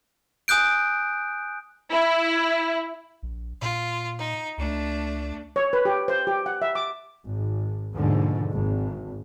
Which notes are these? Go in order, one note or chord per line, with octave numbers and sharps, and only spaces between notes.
G#5 D#6 F#6 G6 D7
E4
A#1
A#2 F4
D#4
C#2 A3 D4
C#5
B4
G4
C5
G4
F#5
E5
D6
G#1
D#2 G#2 B2 D3 F3
G#1